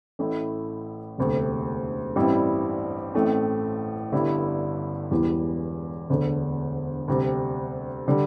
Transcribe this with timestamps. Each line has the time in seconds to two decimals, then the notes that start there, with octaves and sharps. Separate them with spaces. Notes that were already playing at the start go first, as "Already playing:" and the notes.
0.19 A1 A2 A3 E4
1.18 E1 D2 C3 A3
2.16 A1 G2 G3 C4 E4
3.14 A1 A2 A3 C4
4.12 G1 G2 D3 G3 E4
5.11 E1 E2 E3 G3
6.10 E1 D2 D3
7.08 D2 C3 G3
8.08 D3 G3